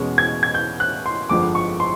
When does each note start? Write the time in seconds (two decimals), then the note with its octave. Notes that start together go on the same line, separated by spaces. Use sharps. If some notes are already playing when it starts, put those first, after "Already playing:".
Already playing: E2 B2 G#3 C#4
0.18 G#6
0.43 G#6
0.54 G6
0.80 F#6
1.06 C6
1.29 G1 F2 D3 F3 G#3 D6
1.55 C#6
1.80 C6